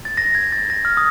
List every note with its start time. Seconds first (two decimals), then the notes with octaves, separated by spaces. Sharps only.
0.05 A6
0.17 A#6
0.35 G#6
0.52 A6
0.70 A#6
0.85 F6
0.97 D#6